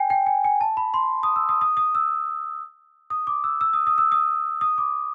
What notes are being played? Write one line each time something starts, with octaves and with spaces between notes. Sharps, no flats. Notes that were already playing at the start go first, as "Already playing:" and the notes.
Already playing: G5 G#5
G5
G#5
G#5
A5
B5
C6
D#6
E6
D#6
D#6
D#6
E6
D#6
D6
E6
E6
D#6
D#6
E6
D#6
D#6
D6